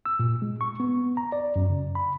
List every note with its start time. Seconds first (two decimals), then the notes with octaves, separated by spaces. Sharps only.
0.06 E6
0.20 A#2
0.42 G#3
0.61 C#6
0.80 B3
1.17 A#5
1.32 D5
1.56 F#2
1.70 C#3
1.95 B5